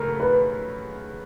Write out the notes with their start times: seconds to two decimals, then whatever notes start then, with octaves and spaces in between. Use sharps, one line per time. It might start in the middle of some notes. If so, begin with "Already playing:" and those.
Already playing: F#2 C#3 A3 A#4
0.20 B4